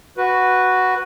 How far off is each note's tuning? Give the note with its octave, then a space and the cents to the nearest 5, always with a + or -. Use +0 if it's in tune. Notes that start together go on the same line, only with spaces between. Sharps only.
F#4 +0 B4 +0